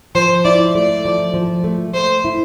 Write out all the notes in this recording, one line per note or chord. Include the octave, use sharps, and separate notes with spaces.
F3 C5
E4 D5
A3 D5
F3
F3
A3
A3 C5
E4